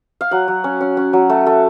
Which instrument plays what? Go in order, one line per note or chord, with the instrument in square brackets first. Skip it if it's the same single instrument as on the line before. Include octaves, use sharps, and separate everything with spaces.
[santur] F5
F#3 F#5
F#3
C#4
C#4
C#4
F#3
A3
A3